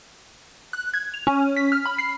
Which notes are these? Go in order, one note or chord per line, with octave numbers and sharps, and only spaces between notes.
F#6
G#6
F7
C#4
B6
F6
B5
C7